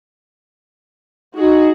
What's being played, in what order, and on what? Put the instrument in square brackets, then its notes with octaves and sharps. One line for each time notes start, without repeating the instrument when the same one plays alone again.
[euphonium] D#4 [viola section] F#4 G#4